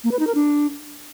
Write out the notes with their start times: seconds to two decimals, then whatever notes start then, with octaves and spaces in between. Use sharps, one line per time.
0.04 A#3
0.12 B4
0.19 D#4
0.27 A#4
0.35 D4